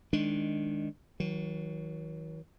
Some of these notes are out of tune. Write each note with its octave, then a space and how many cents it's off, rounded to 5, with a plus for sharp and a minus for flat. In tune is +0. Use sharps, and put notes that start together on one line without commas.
D#3 +0 G#3 +5 D4 +0
D#3 +45 F#3 +0